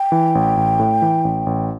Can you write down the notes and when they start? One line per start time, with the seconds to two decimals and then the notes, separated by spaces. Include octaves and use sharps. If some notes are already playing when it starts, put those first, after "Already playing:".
Already playing: G5
0.12 E3
0.35 A1
0.57 A1
0.79 A2
1.02 E3
1.24 A1
1.46 A1